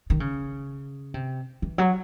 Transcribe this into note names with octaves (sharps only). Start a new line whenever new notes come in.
D#3
C#3
C3
E3
F#3